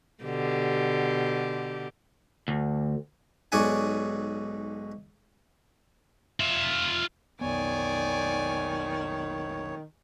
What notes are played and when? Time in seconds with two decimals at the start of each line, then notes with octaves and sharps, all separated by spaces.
0.24 B2 D3 G4
2.48 D2
3.52 B1 G#2 F#4 D5 F#5 G#5
6.40 F4 E5
7.41 B1 F2 D#3 B3 C#5 D5 G#5